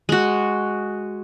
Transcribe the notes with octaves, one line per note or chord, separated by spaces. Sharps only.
G#3 F#4